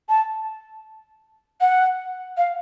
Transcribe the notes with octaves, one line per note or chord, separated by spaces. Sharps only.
A5
F#5
F5